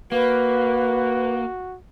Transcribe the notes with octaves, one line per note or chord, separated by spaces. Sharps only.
A#3 F#4 B4